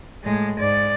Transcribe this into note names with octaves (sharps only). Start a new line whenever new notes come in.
A2 G#3
G#2 D5